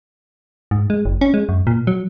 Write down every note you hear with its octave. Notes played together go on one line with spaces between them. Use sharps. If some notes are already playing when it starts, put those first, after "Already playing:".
G#2
G#3
F#1
C#4
G#3
F#2
A#2
F#3